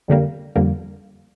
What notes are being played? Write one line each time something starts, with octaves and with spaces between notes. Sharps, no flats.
F2 D3 G3 A#3
F2 D3 G3 A#3